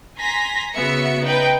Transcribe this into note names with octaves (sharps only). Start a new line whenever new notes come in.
G#5 A#5 C6 A#6 B6
C#3 B3 F#4 E5 C#7
D#4 B4 G5